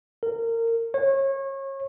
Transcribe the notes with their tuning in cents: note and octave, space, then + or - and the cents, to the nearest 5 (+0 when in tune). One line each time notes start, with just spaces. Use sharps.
A#4 -25
C#5 -30